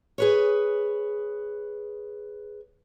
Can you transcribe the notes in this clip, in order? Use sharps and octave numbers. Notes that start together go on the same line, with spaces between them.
G#4 B4 C#5